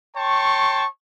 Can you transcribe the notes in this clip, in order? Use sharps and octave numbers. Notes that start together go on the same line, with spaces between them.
C#5 G5 A5 C6 C#6